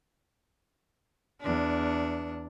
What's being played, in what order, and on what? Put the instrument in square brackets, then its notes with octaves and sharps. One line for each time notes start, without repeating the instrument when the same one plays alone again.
[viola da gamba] E2 D4